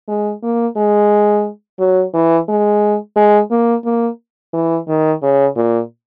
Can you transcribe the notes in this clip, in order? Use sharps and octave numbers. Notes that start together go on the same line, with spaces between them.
G#3
A#3
G#3
F#3
E3
G#3
G#3
A#3
A#3
E3
D#3
C#3
A#2